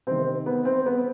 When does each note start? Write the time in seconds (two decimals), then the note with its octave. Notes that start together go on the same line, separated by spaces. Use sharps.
0.07 C3 D#3 C4
0.46 B3
0.65 C4
0.86 B3